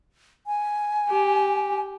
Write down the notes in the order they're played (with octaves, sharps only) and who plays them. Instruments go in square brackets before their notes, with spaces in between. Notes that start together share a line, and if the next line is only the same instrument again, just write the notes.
[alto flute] G#5
[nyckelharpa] G4